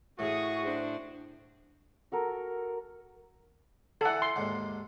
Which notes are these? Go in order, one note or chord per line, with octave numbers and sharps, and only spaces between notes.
A2 F#4 G#4 C#6 D#6
D4 C5
F#4 A4 A#4
D3 E3 A4 F#5
C6
D#2 G#2 D3